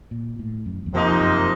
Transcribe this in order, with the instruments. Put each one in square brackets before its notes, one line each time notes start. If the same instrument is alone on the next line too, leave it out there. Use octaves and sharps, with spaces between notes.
[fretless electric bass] A#2
A2
F#2
E2
[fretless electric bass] F2 [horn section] C3 F3 A#3 D#4
[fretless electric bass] F#2